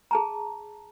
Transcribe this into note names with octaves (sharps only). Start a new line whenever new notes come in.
G#4 A5 A#5